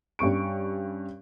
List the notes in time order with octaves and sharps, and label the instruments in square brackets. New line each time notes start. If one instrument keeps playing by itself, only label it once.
[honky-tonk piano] G2 C#4 C#6 D7